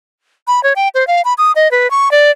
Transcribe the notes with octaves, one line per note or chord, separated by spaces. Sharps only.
B5
C#5
G5
C5
F5
B5
D#6
D#5
B4
C#6
D5